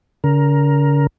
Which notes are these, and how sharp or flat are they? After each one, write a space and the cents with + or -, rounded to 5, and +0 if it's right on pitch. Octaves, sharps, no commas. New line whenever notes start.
D3 -45 A#4 +10